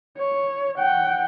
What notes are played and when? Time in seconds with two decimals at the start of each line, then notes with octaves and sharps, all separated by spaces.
0.18 C#5
0.78 F#5 G5